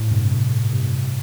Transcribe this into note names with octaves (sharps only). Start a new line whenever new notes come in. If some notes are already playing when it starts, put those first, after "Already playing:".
Already playing: A2
G2 C3
C3
A2
A2
G2 C3